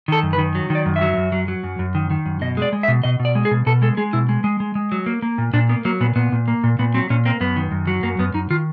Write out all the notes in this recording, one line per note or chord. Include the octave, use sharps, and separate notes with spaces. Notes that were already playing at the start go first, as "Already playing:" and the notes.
D#3 A4
F#2
B4
D#3
F#3
D#3
D5
F#2
E5
F#3
F#2
F#3
F#3
F#2
F#2
D#3
D#3
F#2
B2 D#5
G#3 D5
G#3
E5
B2
B2 D#5
B2
D5
G#3
G#4
B2
B2 A4
G#3 A4
G#3 G#4
B2 E4
G#3
G#3
G#3
G#3
F#3
A#3
A#3
A#2
A#2 D4
A#3 B3
F#3 A#3
A#2 B3
A#2 B3
A#2
A#3
A#2
A#2 B3
F#3 C4
A#2 C#4
A#3 C4
F#2 B3
D#3
F#2
F#3
F#2 A#3
F#2 B3
F#2 D#4
D#3 F4